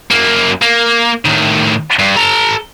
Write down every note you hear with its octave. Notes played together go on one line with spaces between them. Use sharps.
F#2 A#3
A#3
A2 D#3
G2
A4 A#5